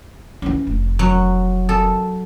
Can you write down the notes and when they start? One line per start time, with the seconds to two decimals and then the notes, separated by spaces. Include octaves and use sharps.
0.42 E3 C#4
0.67 F1
0.99 F#3
1.69 A4